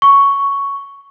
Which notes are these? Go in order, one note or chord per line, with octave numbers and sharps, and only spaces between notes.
C#6